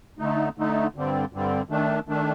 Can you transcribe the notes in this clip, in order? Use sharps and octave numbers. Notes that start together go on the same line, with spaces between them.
D3 A3 D#4
D3 A3 D#4
G2 D3 G3 C4
G2 D3 G3 C4
D#3 A3 D4
D#3 A3 D4